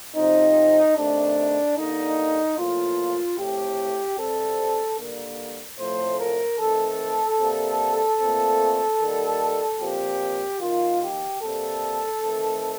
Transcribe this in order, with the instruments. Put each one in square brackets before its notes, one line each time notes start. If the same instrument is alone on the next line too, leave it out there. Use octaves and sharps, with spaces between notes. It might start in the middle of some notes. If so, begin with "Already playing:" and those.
[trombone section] C3 F3 C4 D#4
C3 D#3 A3 D4
D3 G3 A#3 D#4
A2 F3 A#3 F4
A2 A3 C4 G4
C3 G3 C4 A4
D3 G3 A#3
A2 F3 A3 C4 C5
A#4
D#3 A3 C4 A4
C3 G3 A#3
A#2 A3 C4
D#3 G3 A#3
A#2 F3 C4 G4
D#3 A#3 F4
G4
C3 G3 A#3 A4
D#3 A3 C4